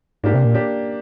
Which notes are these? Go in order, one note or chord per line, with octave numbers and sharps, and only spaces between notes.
G#2 A#3 D4 G4
C3
A#2
A#3 D4 G4